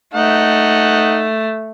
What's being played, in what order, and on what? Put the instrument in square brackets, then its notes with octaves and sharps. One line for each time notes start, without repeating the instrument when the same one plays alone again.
[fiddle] A3 [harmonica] D#4 F#5